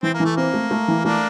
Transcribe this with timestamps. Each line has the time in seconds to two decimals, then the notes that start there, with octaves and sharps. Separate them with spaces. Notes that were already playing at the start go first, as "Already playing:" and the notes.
0.03 E3 C4
0.14 A#3
0.20 E3
0.25 A3
0.37 A#3 C4
0.54 A3
0.71 A3
0.88 E3
1.04 A3 A#3 D4